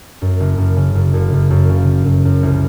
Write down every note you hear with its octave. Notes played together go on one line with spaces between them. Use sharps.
F#2
F#1
F#2
C#3
F#2
F#1
F#2
F#2
C#3
C#3
F#2
F#2
C2